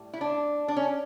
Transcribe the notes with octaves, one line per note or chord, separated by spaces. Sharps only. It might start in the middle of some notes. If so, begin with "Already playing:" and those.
Already playing: A2 G3
E4
D4
D4
C#4